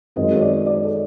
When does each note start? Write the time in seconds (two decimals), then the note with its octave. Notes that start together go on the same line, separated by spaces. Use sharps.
0.16 F#2 D#3 G#3 C4 D#5
0.36 C#5
0.41 D5
0.66 D5
0.83 A4